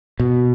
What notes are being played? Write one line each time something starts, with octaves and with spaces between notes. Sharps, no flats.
B2